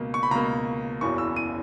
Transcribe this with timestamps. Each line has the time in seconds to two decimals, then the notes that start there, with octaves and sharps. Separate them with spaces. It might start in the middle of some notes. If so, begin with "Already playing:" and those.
Already playing: C#2 B2 A#3
0.14 C#6
0.23 B5
0.31 C#2 B2 A#3 A#5
1.01 F#1 E2 C#3 F#3 C#6
1.18 E6
1.36 D#7